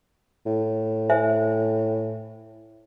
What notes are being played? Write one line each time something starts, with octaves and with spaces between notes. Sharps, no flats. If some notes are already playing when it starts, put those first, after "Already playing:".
A2
C5 E5 G#5